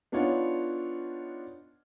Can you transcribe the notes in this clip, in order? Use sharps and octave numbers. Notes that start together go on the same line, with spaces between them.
B3 D4 D#4 F4 C#5 F#5